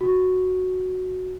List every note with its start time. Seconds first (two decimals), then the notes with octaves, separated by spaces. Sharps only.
0.01 F#4